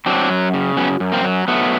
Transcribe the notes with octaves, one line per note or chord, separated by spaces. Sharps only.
F#3 C4 D4
F#2
C#3
F#2 B3 C#4
F#2
A#3 C4
F#3
F#3 A3 B3